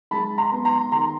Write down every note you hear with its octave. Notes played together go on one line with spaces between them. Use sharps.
G#3 A5 B5
A#5 C6
B3
A#5 C6
D#3 A#5 C6